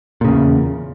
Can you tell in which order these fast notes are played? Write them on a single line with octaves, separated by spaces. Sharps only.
A#2 C#3 E2